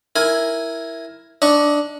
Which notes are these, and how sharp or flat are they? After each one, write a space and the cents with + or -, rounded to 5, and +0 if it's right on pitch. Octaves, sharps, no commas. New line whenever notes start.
E4 +0 A#4 +0 G#5 +0
D4 +0 D#5 +30 C#6 +0